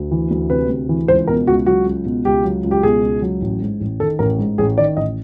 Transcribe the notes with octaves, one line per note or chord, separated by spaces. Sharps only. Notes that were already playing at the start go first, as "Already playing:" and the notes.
Already playing: D2
E3
D2
C3 B4
D2
E3
C#2 C5
B2 A#4
C#2 F#4
F#3 F#4
C#2
B2
C#2 G4
F#3
C#2
G4
B2 G#4
C#2
F#3
A1
G#2
A1
D#3 A4
A1 A#4
G#2
A1 G#4
D#3 D5
A1 D#5